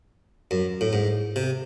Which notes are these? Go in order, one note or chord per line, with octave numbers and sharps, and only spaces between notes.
F#2
A2
G#2
C3